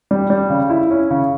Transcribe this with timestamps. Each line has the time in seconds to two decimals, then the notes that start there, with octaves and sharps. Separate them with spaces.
0.11 G3
0.30 G3
0.50 C#3
0.70 E4
0.91 C#4
1.10 C#3